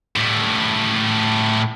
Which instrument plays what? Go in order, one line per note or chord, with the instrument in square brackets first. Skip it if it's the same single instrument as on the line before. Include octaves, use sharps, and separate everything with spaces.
[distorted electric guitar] A2 G3